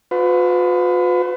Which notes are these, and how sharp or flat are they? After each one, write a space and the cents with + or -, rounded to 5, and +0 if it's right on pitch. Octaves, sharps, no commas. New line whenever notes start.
F4 +45 B4 +30